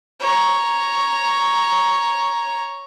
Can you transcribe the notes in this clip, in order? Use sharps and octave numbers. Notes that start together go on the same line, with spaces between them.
C#5 A#5